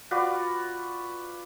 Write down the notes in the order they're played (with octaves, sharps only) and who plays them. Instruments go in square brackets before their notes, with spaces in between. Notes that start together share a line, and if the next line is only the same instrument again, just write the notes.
[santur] F4 F#4 B4 D5